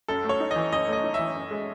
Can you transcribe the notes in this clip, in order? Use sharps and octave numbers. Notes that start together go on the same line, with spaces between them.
F#2 A4
A3
C#5
D#4
D#5
E3
F#2 D#5
A3 D#5
D#4
E3 E5
F#2
G#3